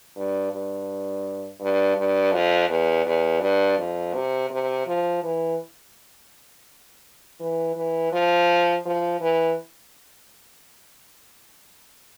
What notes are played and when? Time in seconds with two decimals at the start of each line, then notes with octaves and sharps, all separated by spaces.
0.16 G2
0.52 G2
1.60 G2
1.96 G2
2.33 F2
2.69 E2
3.05 E2
3.41 G2
3.78 F2
4.14 C3
4.50 C3
4.86 F3
5.22 E3
7.40 E3
7.76 E3
8.12 F3
8.85 F3
9.21 E3